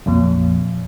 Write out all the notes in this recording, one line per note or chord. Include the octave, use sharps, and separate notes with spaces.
A#1 F2 A#2